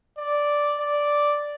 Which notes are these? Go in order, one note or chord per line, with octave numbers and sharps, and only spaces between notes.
D5
D5